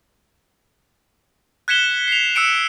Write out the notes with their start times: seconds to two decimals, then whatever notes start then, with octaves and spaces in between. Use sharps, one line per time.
1.68 F#6 G#6 B6 C#7 E7 G7
2.08 C7 F7
2.35 E6 F#6 C#7 D7 E7